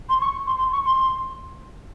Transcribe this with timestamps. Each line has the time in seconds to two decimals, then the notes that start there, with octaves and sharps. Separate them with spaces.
0.09 C6
0.21 C#6
0.46 C6
0.59 C6
0.72 C#6
0.85 C6